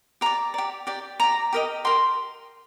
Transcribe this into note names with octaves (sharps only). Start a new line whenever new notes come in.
G4 D5 A#5
G4 D5
G4 D5
G4 D5 A#5
G4 A#4 D#5
G4 A#4 C6